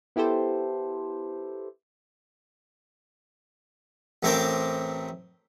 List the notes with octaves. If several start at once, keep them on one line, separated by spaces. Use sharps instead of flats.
B3 E4 G4 A4 C5
A1 A3 C4 A#4 C5 D6